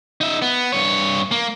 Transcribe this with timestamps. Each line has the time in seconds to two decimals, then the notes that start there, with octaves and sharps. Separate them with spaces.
0.21 D#4 E5
0.42 B3
0.72 G2 C#5
1.31 A#3